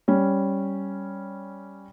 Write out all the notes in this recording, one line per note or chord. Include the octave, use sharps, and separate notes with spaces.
G3 C#4